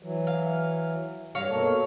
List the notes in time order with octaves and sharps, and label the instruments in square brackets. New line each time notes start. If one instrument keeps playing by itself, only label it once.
[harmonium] E3 F#3
[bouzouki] F5
[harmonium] G2 G3 [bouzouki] F#3 C#5 F5
[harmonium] B2 A#3 A4